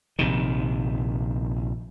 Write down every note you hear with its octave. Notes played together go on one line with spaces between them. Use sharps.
A#1 C3 D#3